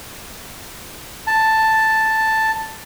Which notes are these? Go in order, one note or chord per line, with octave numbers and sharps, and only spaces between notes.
A5